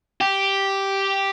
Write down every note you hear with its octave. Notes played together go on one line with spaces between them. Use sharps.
G4